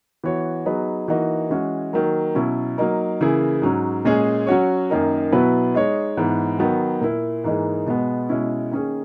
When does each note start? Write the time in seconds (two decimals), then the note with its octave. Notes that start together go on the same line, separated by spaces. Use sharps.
0.24 E3 B3 F#4 C#5
0.66 F#3 B3 D#4 G#4 B4
1.08 E3 A#3 D#4 F#4
1.50 E3 G#3 C#4 F#4
1.93 D#3 F#3 A#3
2.35 B2 F#3 C#4 E4
2.78 F#3 A#3 D#4 A#4
3.21 C#3 E3 A#3 E4 G#4
3.62 G#2 F#3 C#4
4.05 A#2 G#3 C#4 G#4
4.47 F#3 C#4 F#4 C#5
4.90 F#2 D#3 A#3 D#4 A#4
5.32 B2 F#3 B3 E4 B4
5.74 G#3 D#4 G#4 C#5
6.17 G#2 E3 B3
6.59 D#3 F#3 B3
7.01 A#2 A#3 E4
7.44 G#2 E3 A#3 D#4 G#4
7.86 B2 G#3 B3
8.29 B2 G#3 C#4 E4
8.71 D#3 A#3 C#4 G#4